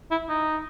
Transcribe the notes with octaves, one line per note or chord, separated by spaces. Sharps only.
E4
D#4